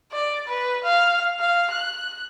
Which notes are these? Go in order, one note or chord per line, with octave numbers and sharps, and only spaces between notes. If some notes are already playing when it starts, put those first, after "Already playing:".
D5
B4
F5
F5
F#6